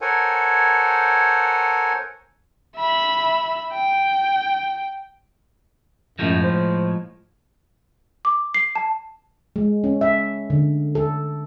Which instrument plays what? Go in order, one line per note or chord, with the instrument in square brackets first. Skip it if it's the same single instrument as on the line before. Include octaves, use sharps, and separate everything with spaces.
[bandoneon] A4 A#4 C5 C#5 F#5 G#5
[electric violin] E5 B5
G5
[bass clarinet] F#2 [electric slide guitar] A2 F3 G#3
[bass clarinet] C5
[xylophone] D6
C7
A5
[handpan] G#3
C#4
E5
D3
A4